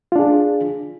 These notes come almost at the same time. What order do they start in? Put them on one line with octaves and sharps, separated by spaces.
F4 D4 G#4